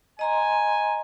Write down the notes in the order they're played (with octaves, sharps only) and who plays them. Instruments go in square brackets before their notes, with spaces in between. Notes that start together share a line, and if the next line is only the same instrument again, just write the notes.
[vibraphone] D#5 A#5 C6 [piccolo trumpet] G#5